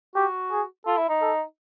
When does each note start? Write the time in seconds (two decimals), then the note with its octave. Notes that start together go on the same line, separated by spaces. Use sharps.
0.15 F#4 G4
0.51 G#4
0.86 F4 A4
0.97 E4
1.09 D#4
1.21 A4